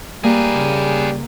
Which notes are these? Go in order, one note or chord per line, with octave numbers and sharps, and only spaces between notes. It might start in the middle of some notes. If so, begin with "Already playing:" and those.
G3 A#3 G#4 B4
C#3